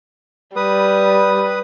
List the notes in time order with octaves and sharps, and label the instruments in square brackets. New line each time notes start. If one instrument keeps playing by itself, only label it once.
[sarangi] G3 [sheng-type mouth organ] B4 D#6